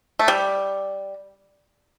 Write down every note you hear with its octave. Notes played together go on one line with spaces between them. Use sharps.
A3
G3